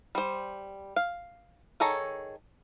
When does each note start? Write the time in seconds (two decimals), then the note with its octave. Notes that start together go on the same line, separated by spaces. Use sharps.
0.15 G3 C5
0.96 F5
1.80 D#3 G#4 A4 C#5 A#5